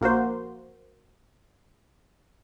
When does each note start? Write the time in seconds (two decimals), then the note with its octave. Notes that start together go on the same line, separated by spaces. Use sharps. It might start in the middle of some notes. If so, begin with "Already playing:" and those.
0.01 A#1 A#3 F#4 C5